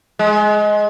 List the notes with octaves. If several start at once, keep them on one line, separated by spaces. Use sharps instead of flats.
G#3